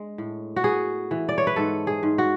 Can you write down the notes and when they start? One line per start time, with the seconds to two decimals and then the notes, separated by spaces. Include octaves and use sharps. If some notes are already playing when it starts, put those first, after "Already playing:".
Already playing: G#3 D4
0.18 A2
0.56 F#4
0.64 B3 G#4
1.11 E3
1.29 D5
1.38 C#5
1.47 B4
1.56 G#2 A4
1.87 G#4
2.03 G#2
2.18 F#4